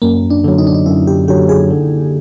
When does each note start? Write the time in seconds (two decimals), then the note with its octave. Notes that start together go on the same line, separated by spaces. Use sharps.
0.02 F#2 A#3
0.30 D4
0.44 D3 F#3
0.58 D#4
0.67 D4
0.74 D#4
0.86 F#2 E4
1.07 G4
1.28 D3 F#3 G4
1.49 G#4
1.70 D3